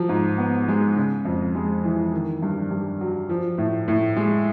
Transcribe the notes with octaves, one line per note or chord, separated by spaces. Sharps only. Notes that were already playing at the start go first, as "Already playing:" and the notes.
Already playing: F3 F#3
G#2
B3
G#3
C#3
F2
G#3
E3
D#3
G2
G2
F#3
F3
A2
A2
G#3